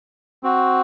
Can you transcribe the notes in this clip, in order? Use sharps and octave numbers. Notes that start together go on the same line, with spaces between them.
C4 F#4